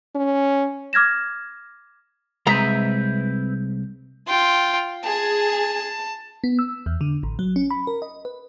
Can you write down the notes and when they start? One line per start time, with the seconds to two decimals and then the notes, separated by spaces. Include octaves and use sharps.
0.15 C#4
0.93 D6 F6 G#6 A#6 E7
2.47 C2 G#3 C4 B4 E5 A#5
4.27 F4 G5
5.05 G#4 A5
6.44 B3
6.59 E6
6.86 E2
7.01 D3
7.23 A1
7.39 F#3
7.56 C#4
7.71 B5
7.87 A#4
8.02 D#5
8.25 B4